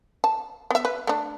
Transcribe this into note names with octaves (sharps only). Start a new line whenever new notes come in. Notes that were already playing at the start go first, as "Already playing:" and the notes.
A5
B3 E5
B4
A3 D4